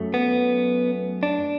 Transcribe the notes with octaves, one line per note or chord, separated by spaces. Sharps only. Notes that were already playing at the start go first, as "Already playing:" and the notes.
Already playing: F#2 F#3 A3
B3
D4